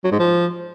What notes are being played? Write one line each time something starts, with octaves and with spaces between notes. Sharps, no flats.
F#3
G#2
F3